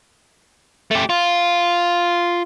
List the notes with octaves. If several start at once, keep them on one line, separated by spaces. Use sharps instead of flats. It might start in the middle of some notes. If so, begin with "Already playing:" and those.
A3 G4
F4